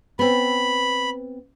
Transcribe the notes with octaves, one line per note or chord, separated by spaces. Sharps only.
B3 C4 B5